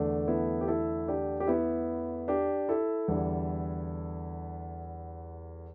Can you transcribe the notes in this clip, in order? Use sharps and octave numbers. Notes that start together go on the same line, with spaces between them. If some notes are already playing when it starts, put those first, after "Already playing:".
Already playing: E2 D3 A3 D4
B3 E4
G4
E4 A4
D4 G4
G4
B3 E4
D4 G4
E4 A4
E2 D3 G3